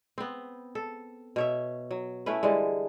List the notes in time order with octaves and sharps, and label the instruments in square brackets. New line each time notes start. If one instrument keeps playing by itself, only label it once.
[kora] B3 C4
A4
B2 C#5 E5
F#3
A3 C#4 E4 B4
D3 E3 G3 G#3